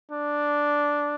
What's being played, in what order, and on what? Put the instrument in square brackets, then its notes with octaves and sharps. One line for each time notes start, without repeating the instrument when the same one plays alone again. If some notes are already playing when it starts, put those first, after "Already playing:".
[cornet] D4